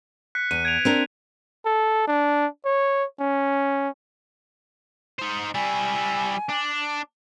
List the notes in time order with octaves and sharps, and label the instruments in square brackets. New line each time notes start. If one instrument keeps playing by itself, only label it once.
[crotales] F#6 B6 C#7
[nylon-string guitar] E2 [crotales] D#7
[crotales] G#6 D7 F7
[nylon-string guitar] C4 D4 A#4
[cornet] A4
D4
C#5
C#4
[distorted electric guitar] D#4 C5
[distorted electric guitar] G3 E4 [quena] G#5
[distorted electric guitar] D4